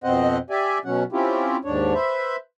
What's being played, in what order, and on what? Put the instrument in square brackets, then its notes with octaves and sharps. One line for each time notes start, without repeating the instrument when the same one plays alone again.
[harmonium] F2 B2 C4 C5 D#5 F#5
G4 D5 E5 G#5
B2 F#3 C#4 F#5
C4 C#4 E4 F4 G4
D#2 G#2 D4 C#5
B4 C5 E5